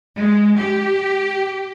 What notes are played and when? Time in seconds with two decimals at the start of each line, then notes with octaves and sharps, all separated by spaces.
0.16 G#3
0.57 G4